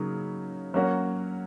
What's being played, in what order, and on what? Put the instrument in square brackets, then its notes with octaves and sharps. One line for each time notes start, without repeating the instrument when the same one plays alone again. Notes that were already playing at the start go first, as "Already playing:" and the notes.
Already playing: [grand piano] C#3 F#3 A#3 D#4
F#3 A#3 C#4 F#4